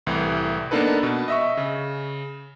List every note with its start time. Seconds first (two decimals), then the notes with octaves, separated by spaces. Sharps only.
0.07 C2 A2 E3
0.71 A#3 B3 D4 D#4 A4 B4
1.03 B2
1.28 D#5 E5 C#6
1.57 C#3